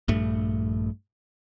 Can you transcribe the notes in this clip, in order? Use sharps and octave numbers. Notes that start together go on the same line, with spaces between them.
A#1 G2 A3